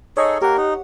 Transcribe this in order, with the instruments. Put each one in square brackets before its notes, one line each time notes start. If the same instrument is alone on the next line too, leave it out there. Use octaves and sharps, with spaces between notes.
[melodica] D#4 G#4 A4 [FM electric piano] C#5 D#5 C#6
[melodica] A#3 A#4 [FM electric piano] G4 F#5
[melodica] D#4